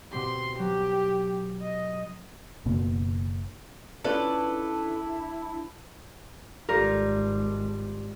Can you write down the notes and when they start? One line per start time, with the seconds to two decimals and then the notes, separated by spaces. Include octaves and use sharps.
0.12 B2 C4 G4 C6
0.59 F#3 G4
1.62 D#5
2.65 F#1 B2 A#3 B3
4.04 C#4 D4 E4 F4 A4 B4 D5 A5
6.69 G#1 G3 F4 A#4